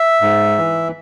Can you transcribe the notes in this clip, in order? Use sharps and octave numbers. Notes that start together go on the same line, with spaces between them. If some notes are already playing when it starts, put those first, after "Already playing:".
Already playing: E5
G#2
E3